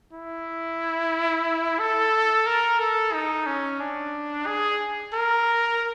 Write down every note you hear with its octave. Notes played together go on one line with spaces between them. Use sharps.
E4
A4
A#4
A4
D#4
C#4
D4
G#4
A#4